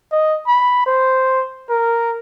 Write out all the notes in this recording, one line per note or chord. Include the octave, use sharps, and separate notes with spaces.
D#5
B5
C5
A#4